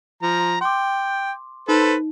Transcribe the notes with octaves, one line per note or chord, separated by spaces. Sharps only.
F3 A#5
G5 C6 D6
D#4 A4 B4 C5